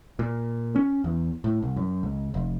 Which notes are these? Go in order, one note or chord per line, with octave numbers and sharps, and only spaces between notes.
A#2
C#4
E2
A2
C2
F#2
C#2
F1